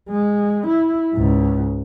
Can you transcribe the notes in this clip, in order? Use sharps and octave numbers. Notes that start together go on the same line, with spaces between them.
G#3
E4
C#2 G#2